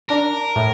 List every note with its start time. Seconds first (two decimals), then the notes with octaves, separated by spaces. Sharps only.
0.09 D4 A#4
0.56 A2